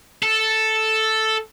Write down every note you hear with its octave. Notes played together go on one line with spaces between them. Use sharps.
A4